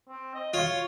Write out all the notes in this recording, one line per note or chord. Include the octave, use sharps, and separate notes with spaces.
C4
D#5
F4 C#5